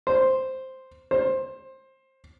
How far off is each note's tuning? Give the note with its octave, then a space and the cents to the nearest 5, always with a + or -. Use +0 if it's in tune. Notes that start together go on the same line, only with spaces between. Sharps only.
C5 +0
C5 +20